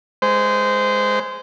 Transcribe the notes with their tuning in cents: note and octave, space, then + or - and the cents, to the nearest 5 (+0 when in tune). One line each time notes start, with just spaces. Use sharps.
G#3 +0 C5 -20